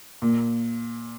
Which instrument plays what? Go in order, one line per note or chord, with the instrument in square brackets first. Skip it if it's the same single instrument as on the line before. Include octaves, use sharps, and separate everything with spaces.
[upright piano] A#2